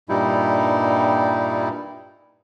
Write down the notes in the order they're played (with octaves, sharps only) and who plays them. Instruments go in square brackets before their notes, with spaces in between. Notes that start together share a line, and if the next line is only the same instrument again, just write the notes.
[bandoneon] G2 A#2 G3 D#4 E4